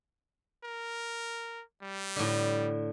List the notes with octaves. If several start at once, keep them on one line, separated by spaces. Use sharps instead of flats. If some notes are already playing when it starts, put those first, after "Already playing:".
A#4
G3
A2 D3